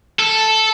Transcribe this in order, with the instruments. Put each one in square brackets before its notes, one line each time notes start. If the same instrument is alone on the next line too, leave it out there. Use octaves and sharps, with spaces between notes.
[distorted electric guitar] A4